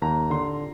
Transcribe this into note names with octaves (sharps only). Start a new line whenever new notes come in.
D#2 A#5
D3 C6